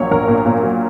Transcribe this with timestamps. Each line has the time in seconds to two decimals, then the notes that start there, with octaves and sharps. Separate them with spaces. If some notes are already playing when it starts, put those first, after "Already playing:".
Already playing: A#1 A#2 F#3 C#5
0.11 A#1 A#4
0.28 A#2
0.46 A#2
0.63 F#3